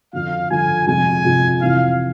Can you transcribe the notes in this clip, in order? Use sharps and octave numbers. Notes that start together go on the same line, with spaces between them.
F2 D3 F3 F5
F2 D3 F3 G#5
F2 C3 F3 G#3 G#5
F2 C3 F3 G#3
F2 C3 E3 F5